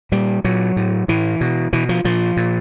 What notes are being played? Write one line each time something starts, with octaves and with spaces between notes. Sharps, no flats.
A#2 G3
A#2 F#3
A2
A2 E3
B2
B2 E3
F3
A#2 F3
A#2